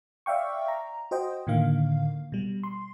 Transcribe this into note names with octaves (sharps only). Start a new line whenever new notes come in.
D5 E5 F5 G5 C#6
A#5
F#4 C5 D#5 G5
A2 D3 D#3 A#3 F5
B2 G3
C6